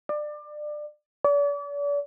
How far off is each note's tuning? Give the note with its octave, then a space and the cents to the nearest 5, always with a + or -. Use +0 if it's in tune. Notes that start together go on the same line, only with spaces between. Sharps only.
D5 +25
D5 -40